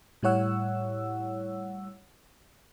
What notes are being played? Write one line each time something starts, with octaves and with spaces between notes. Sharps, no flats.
A2 G3 E4 C#5 F#5 E6